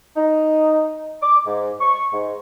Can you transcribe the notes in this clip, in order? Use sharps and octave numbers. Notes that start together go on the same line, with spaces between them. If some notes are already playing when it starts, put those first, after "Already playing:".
D#4
D6
G#2
C#6
G#2